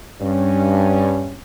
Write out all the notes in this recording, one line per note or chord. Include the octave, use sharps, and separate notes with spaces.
G2 C#4